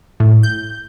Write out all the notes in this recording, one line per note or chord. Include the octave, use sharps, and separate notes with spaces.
A2
G6